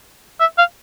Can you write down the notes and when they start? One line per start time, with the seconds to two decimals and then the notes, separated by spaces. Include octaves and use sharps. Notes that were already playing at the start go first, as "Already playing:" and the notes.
0.40 E5
0.58 F5